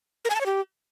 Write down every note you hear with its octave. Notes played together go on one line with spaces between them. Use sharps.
A#4
G#5
A5
C#5
G4